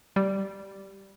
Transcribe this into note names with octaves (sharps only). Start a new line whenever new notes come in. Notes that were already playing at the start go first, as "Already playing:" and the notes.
G3